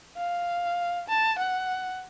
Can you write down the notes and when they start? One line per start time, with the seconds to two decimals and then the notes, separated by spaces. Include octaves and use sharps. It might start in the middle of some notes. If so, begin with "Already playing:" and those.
0.17 F5
1.08 A5
1.39 F#5